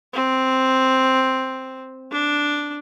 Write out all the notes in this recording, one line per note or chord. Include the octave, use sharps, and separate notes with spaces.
C4
D4